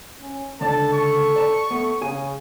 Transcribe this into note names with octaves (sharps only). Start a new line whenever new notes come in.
C#4
C#2 D3 A4 D5 A5
C#6
D5 A5 B5
A3 B3
C#3 G#4 G#5